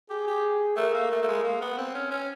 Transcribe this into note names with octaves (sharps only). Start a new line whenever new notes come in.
G4 G#4
G4
A3 A#4
A#3
A3
A3
G#3
A#3
B3
C4
C#4
C#4